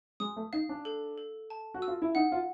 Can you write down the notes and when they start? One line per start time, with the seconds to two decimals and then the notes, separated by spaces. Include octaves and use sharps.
0.20 G#3 D#6
0.37 A3
0.53 D#4 F5
0.69 D4
0.85 A4
1.18 A4
1.50 A5
1.74 F#4
1.82 E6
1.88 F4
2.02 E4
2.15 D#4 F#5
2.32 F4